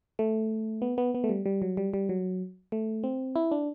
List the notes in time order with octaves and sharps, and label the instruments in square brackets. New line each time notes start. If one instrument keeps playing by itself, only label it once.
[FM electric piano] A3
B3
B3
B3
A3
G3
G3
F#3
G3
G3
F#3
A3
C4
E4
D4